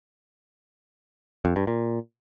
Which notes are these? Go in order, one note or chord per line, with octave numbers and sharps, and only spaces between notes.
F2
G2
A#2